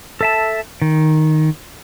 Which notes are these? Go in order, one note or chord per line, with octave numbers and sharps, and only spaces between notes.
A4 E5 A5
D#3